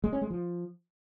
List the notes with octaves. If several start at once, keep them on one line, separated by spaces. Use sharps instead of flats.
G#3
C#4
G#3
F3